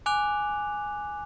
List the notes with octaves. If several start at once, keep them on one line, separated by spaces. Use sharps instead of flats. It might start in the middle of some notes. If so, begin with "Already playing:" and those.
G#5 D6 F#6 F7